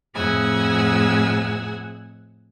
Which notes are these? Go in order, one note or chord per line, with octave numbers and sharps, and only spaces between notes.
F2 A2 G#4 F#5 G#5 E6